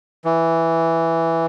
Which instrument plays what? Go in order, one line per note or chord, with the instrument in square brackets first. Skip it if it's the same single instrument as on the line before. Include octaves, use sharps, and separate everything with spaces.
[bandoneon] E3